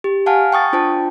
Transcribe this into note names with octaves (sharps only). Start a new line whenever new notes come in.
G4
F5 F#5 G#5 A5 F6
G5 C#6 D#6 A6
D4 F4 C5 G5 A5